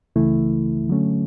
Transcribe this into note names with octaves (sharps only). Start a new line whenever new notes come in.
C#2 C#3 E3 A3 E4
D3 F#3 A3 C#4